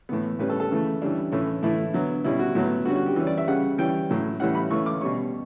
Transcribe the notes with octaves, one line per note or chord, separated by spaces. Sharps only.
A2 E3 B3
A2 G3 C#4 B4
A4
A4
C#3 E3 A3
E3 G3 C#4 D4
A2 E3 A3 C#4
A2 E3 A3 E4
D3 F#3 B3
B2 G3 C#4 E4
F#4
A2 F#3 B3
D3 G3 C#4 F#4
F#4
G4
E3 G3 C#4
D5
E5
C#3 G3 C#4 F#5
E3 G3 C#4 G5
A2 F#3 C#4
A2 E3 G3 C#4 F#5
B5
E3 A3 C#4 C#6
D6
B2 G3 C#4 C#6